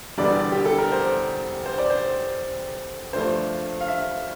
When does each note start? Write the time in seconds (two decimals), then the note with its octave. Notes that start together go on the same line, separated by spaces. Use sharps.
0.17 E1 E2 D3 G3 D4 D5
0.52 G4
0.65 A4
0.78 A#4
0.92 C5
1.66 C5
1.78 D5
1.90 C5
3.13 G2 F3 A3 D4 C5
3.81 F5
3.88 E5